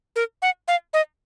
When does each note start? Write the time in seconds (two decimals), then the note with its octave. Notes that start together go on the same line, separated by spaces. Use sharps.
0.16 A#4
0.42 F#5
0.68 F5
0.93 D#5